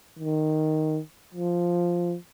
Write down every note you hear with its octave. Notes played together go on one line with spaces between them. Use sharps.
D#3
F3